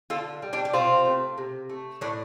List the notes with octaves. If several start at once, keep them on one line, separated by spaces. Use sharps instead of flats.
D3 F4 A4
G3
D4 G4
G4
C3 C4 F4
A3
C3
A3
A2 A3 D4